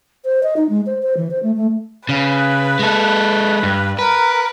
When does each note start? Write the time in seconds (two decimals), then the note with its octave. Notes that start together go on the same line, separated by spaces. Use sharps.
0.24 C5
0.43 D#5
0.56 D#4
0.69 G#3
0.86 C5
1.02 C5
1.16 E3
1.30 C5
1.42 A3
1.56 A3
2.09 C#3 B4
2.79 G#3 A4
3.63 G2
3.99 A#4 B4